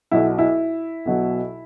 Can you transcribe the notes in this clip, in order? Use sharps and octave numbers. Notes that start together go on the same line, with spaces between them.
B1 B2 F#3 E4
E4
B1 B2 F#3